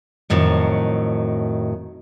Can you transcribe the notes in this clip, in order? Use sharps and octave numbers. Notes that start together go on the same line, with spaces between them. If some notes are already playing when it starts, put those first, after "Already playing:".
F2 A2 D#3 F#3